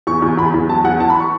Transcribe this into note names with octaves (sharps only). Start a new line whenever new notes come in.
E2 C#6
E2
E2 B5
E2
F#3 A5
E2 F#5
E3 A5
B5
C#6